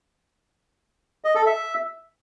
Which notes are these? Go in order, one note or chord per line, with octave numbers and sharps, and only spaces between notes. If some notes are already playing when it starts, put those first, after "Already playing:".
D#5
A4
E5